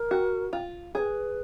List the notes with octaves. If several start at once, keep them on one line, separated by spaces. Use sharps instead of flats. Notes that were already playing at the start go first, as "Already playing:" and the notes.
Already playing: A#4
F#4
F4
G#4 B4 C#5